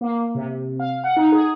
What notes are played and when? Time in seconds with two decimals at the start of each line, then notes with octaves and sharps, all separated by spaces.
0.01 A#3
0.35 C3
0.80 F5
1.04 F#5
1.16 D#4
1.32 G#4